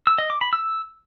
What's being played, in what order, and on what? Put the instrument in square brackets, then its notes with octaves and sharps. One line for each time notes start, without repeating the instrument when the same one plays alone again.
[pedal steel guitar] E6
D#5
D6
B5
E6